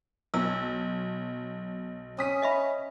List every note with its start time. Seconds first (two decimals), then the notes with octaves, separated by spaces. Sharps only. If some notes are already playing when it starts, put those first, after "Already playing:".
0.34 B1 E6
2.19 C#4 D#6 B6 D#7
2.42 D#5 E5 B5